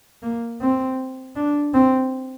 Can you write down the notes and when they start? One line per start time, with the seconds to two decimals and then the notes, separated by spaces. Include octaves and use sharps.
0.23 A#3
0.61 C4
1.36 D4
1.74 C4